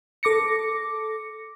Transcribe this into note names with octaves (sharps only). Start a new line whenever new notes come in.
A4 D6 A#6 C#7